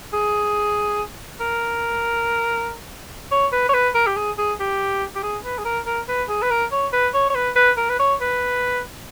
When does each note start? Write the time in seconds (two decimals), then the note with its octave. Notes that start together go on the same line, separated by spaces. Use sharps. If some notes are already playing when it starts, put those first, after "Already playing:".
0.13 G#4
1.40 A#4
3.32 C#5
3.52 B4
3.69 C#5
3.74 B4
3.95 A#4
4.07 G4
4.16 G#4
4.38 G#4
4.60 G4
5.15 G4
5.23 G#4
5.45 B4
5.58 G#4
5.65 A#4
5.86 A#4
6.08 B4
6.29 G#4
6.42 B4
6.51 A#4
6.72 C#5
6.93 B4
7.14 C#5
7.30 C#5
7.35 B4
7.56 B4
7.77 A#4
7.90 B4
7.99 C#5
8.21 B4